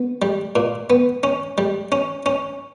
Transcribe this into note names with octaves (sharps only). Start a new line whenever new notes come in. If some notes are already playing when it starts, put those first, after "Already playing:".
Already playing: B3
G3
A#2
B3
C#4
G3
C#4
C#4